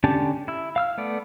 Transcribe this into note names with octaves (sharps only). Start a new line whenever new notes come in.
D3 C#4 D4 G4 A5
E4 E6
F5 E6 F6
A3 B3 D5